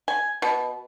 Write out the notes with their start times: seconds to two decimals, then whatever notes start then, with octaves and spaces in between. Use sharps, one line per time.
0.08 G#5
0.42 B2